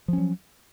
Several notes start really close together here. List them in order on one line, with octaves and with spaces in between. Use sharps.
F3 C#4 F#3